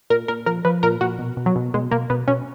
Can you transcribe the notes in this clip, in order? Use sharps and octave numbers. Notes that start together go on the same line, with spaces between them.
A#2 A#4
A#2 A#4
F3 A#4
F3 B4
A#2 A#4
A#2 F#4
B2
B2
F#3
B2
B2 G#3
B2 A#3
B2 B3
B2 C#4